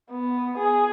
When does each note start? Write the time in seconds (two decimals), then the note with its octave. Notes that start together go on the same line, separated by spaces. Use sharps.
0.11 B3
0.58 G#4